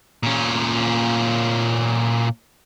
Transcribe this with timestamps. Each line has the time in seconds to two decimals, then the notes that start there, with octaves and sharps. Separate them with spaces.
0.23 A#2 C#4